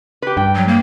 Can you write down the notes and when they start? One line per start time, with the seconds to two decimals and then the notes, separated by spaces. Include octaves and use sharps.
0.22 G4 B4
0.37 G2 G5
0.55 F#3
0.68 A#3